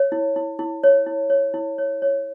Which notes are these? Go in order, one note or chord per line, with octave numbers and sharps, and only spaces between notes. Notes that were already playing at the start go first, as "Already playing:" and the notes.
Already playing: C#5
E4
E4
E4
C#5
E4
C#5
E4
C#5
C#5